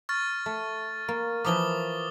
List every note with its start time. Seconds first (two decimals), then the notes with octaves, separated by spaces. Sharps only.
0.09 C#6 F6 A6
0.46 A3
1.08 A#3
1.45 E3 F3 A#3 D6 D#6 G7